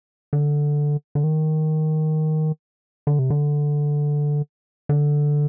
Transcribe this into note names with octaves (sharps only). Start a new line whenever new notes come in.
D3
D3
D#3
D3
C3
D3
D3